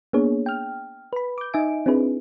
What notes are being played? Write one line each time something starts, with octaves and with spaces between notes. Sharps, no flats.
A#3 B3 D4 G#4 C#5
G5 F6
B4 B5
D6 G6
D#4 D#5 E5 G#5 D7
C4 D4 E4 G#4 B4